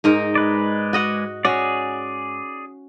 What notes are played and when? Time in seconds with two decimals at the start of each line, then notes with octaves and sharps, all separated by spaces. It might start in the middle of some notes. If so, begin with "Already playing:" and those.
0.04 G#2 D#4 A#4
0.35 G#3 B4 D5
0.93 F#4 D#5 F#5
1.45 C#4 F#4 G#4 D5